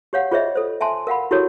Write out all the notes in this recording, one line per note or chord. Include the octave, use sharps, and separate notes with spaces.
G4 C#5 F5 F#5
F4 G#4 C5 C#5 D#5 E5
A4 C5
E5 G#5 A5 C6
A#4 F5 F#5 B5
E4 F#4 G4 A4 A#4 C#5